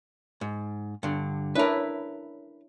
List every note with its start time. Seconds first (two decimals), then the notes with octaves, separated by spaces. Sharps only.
0.41 G#2
1.03 G2 D3
1.55 C#4 D4 E4 A#4 B4